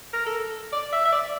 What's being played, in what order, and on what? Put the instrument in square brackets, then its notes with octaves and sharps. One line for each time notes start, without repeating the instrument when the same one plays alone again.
[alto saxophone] A#4
A4
D5
E5
E5
D5